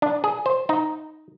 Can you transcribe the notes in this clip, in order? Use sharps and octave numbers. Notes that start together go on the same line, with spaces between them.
D4
G#4
C5
D#4